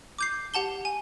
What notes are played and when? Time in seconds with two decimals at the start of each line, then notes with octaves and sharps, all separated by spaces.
0.19 D6 G6 C7
0.54 G4 F#5 A5 G7
0.85 G#5